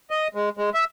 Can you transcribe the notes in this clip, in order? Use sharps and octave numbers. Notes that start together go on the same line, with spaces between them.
D#5
G#3
G#3
E5